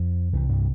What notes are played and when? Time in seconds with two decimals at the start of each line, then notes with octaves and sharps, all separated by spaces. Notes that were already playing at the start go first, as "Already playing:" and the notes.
Already playing: F2 F3
0.33 C2 C3 E3
0.49 G2 G3